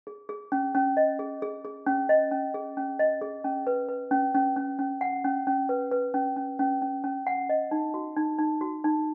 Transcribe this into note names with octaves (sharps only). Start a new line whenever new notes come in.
G#4
G#4
C#4
C#4
D#5
G#4
G#4
G#4
C#4
D#5
C#4
G#4
C#4
D#5
G#4
C#4
B4
B4
C#4
C#4
C#4
C#4
F#5
C#4
C#4
B4
B4
C#4
C#4
C#4
C#4
C#4
F#5
D#5
D#4
F#4
D#4
D#4
F#4
D#4